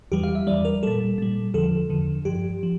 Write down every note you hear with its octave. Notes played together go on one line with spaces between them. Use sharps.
E2 E3 G3 G4
F5
E5
E2 E3 G3 D5
A#4
A#2 G3 A4
A#2 G3
E2 D3 F3 A4
E2 D3 F3
G2 F3 G4
F3